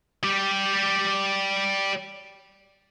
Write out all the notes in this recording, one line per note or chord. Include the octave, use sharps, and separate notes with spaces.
G3 G4